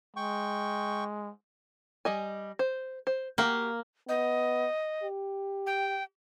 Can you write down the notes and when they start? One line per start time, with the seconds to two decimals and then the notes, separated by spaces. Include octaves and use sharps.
0.16 G#3 G5 C#6
2.05 G3 D#5 G#5
2.59 C5
3.07 C5
3.38 A#3 F#4 G4 F5
4.09 B3 D#5
5.03 G4
5.66 G5